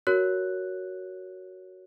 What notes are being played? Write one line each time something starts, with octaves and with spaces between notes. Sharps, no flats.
F#4 A#4 C#5 F#6